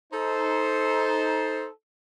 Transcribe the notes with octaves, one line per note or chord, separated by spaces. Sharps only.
D#4 A4 C5